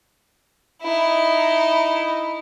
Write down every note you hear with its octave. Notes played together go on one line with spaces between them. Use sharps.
D#4 E4